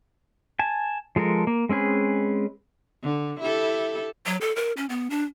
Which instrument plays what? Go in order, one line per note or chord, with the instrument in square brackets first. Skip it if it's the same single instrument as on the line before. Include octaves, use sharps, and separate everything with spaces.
[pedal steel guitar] G#5 A5
F3 G#3 A4 A#4
A#3
G#3 C4 C#4 G#4 B4
[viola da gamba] D3
E4 G4 A4
[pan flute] F#3
A4
A#4
C#4
B3
D4